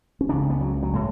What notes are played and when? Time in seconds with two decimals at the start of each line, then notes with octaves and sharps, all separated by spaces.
0.21 C#4
0.29 C#2 C#3 D4
0.50 B3
0.61 F#3
0.83 F#3
0.94 A2 G#3